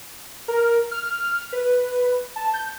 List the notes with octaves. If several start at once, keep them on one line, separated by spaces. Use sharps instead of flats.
A#4
F6
B4
A5
G6